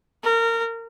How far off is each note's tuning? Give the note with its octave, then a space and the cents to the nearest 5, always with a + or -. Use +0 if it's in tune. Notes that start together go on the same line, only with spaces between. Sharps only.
A#4 -25